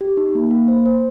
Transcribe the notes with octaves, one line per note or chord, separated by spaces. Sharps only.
G4
D#4
A#3
A#3
C5
C5